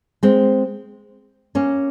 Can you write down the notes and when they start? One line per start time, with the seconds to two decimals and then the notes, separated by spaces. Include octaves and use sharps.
0.23 G#3 C4
1.55 A#3 C#4